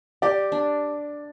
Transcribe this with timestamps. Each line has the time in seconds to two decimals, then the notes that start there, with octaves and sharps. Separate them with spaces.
0.22 G4 D5
0.52 D4